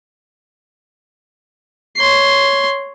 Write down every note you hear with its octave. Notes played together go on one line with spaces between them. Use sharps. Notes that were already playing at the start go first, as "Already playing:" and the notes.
C#5 C6